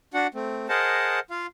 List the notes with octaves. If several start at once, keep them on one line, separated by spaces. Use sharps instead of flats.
D4 F#4 F#5
A3 C4
G#4 A#4 C5 D#5 F#5 A5
F4 F5